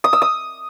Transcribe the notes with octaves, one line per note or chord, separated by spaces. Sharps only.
D#6
E6
D#6